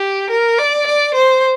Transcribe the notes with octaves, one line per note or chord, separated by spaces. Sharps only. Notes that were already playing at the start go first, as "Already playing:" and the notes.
Already playing: G4
A#4
D5
D5
C5